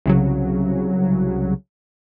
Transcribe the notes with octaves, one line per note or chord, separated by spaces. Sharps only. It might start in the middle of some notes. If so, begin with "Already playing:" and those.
C2 C#3 F#3